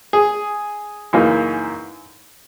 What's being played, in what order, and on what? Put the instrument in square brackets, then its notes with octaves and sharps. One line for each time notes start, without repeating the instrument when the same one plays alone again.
[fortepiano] G#4
F#2 C#3 E3 A#3 D#4